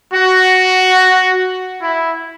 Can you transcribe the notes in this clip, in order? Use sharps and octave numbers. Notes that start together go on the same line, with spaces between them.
F#4
E4